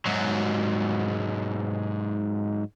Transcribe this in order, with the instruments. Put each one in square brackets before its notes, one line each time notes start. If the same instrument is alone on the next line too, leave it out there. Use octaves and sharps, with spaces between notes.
[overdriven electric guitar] G#2 F#3